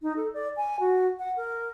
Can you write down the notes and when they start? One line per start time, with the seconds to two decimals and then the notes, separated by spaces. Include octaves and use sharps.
0.02 D#4
0.16 A4
0.33 D5
0.56 G#5
0.80 F#4
1.19 F#5
1.36 A#4